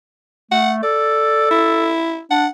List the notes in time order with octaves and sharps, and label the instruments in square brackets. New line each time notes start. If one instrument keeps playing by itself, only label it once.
[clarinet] A3 [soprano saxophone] F#5
[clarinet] A4 [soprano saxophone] D5
[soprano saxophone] E4
[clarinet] D4 [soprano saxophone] F#5